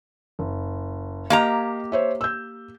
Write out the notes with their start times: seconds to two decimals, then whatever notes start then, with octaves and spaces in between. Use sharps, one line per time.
0.39 F#1
1.30 A#3 G4 D#5 F5 A#5
1.92 C5 C#5 E5
2.21 E6 G6